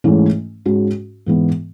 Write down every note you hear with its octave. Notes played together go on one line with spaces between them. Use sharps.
G#2 E3 A3 C#4 E4
G#2 G#3 C#4 F#4
G#2 E3 B3